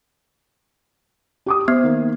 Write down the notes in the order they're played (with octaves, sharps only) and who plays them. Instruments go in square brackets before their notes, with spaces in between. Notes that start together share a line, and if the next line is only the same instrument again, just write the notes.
[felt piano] G4 D6 D#6
[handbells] B3 [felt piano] C5
[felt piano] D#3 A#3